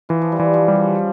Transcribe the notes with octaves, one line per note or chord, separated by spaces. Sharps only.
E3 F4
F3
G3
E3
F3
G3
C#3